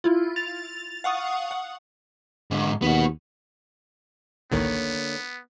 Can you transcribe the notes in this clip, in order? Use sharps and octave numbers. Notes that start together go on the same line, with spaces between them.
E4 F4
A6 F7
F5 F#5 C#6 D#6
F#5
G#2 D3
D#2 B3 F#4
A1 D2 D3 D#3 A#3 B3 C#5